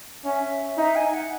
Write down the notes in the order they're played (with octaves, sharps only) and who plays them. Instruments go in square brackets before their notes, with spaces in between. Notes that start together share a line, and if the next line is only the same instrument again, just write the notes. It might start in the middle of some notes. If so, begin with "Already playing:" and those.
[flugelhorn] C#4 [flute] E5
[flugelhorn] D#4 [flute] E5
[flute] G#5
F#5